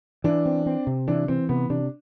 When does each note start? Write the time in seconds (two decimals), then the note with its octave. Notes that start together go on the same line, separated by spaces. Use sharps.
0.24 E3 D4
0.46 C4
0.66 C4
0.87 C3
1.08 E3 D4
1.28 E3 C4
1.49 C3 B3
1.70 C3 D4